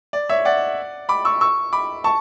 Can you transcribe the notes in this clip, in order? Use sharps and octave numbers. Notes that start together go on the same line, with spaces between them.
D5
C#5 E5
D5 F#5
B5 D6
C#6 E6
C#6 E6
B5 D6
A5 C#6